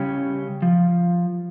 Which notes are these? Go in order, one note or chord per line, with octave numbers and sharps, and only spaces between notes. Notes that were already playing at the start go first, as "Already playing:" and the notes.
Already playing: C#3 G3 C#4 G4
F3